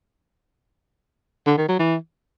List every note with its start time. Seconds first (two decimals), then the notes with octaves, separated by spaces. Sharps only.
1.47 D3
1.57 D#3
1.68 F#3
1.79 E3